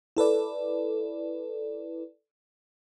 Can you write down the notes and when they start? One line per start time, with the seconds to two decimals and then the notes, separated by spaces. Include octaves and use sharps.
0.17 E4 A4 B4 D5